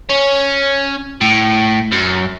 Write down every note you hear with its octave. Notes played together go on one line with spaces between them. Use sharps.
C#4
A2
F#2